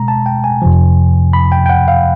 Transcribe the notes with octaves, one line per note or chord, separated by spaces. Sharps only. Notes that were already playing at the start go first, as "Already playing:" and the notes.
Already playing: B2 G#3 A#5
A5
G5
G#5
F2 C3 F3
B5
G5
G5
F#5
F5